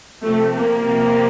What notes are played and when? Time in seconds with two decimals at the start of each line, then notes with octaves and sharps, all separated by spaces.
0.23 C3 F3 A3
0.54 A#3
0.85 C3 F3